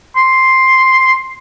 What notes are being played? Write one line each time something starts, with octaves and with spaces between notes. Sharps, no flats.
C6